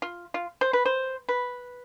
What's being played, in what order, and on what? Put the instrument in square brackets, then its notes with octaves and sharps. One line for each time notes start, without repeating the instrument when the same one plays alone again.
[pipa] F4
F4
C5
B4
C5
B4